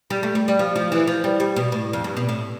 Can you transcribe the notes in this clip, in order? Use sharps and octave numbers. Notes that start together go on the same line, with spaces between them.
G3
A3
G3
G3
F3
F3
E3
F3
G3
G3
B2
A2
F2
G2
B2
A2